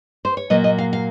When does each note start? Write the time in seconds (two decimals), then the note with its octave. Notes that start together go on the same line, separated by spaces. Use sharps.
0.25 C5
0.37 C#5
0.50 A#2 F#3 A#3 D#5
0.64 D#5
0.78 F5
0.93 F5